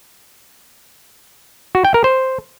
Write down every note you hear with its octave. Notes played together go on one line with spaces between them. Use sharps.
F#4
G5
A#4
C5